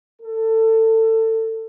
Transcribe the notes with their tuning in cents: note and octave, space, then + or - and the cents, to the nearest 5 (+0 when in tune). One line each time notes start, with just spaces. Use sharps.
A4 +25